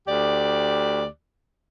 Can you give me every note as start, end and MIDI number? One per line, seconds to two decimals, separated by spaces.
0.07 1.05 38
0.07 1.05 67
0.07 1.05 74